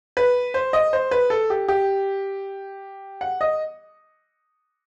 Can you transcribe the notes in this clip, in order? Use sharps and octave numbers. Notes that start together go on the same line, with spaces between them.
B4
C5
D#5
C5
B4
A4
G4
G4
F#5
D#5